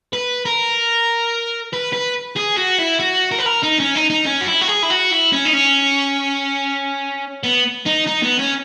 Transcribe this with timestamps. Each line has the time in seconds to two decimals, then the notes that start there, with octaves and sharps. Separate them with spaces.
0.13 B4
0.45 A#4
1.73 B4
1.93 B4
2.36 G#4
2.56 F#4
2.79 E4
3.00 F#4
3.32 A#4
3.39 B4
3.46 A#4
3.63 D#4
3.79 C#4
3.95 D#4
4.10 D#4
4.26 C#4
4.41 F#4
4.48 E4
4.61 F#4
4.68 G#4
4.83 E4
4.90 F#4
5.11 E4
5.33 C#4
5.45 D#4
5.53 C#4
7.43 B3
7.86 D#4
8.07 D#4
8.23 B3
8.39 C#4